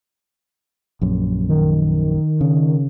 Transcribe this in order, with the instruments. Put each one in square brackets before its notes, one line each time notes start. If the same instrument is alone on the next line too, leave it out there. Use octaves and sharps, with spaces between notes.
[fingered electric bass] A#1 F#2
[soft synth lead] D#3
[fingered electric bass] C#3